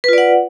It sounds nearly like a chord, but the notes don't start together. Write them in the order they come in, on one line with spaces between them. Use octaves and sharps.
B4 F4 D5 F#5